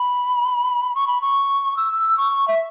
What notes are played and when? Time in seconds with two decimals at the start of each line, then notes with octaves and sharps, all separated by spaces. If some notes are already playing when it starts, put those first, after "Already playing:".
Already playing: B5
0.95 C#6
1.07 B5
1.22 C#6
1.77 E6
2.18 C#6
2.48 E5